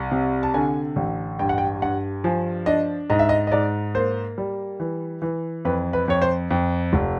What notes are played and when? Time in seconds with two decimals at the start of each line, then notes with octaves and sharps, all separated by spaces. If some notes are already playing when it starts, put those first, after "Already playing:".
Already playing: C2
0.12 C3
0.43 A5
0.54 D3 G#5
0.96 A1
1.39 G2 G5
1.49 F#5
1.58 G5
1.82 G2 F#5
2.24 F3 G#5
2.66 D4 D#5
3.10 G#2 D#5
3.19 E5
3.29 D#5
3.47 D#5
3.51 G#2 D5
3.95 A#3 C5
4.38 G3
4.80 E3
5.22 E3
5.65 F2 B4
5.93 B4
6.08 F2 C#5
6.22 C5
6.50 F2
6.93 F1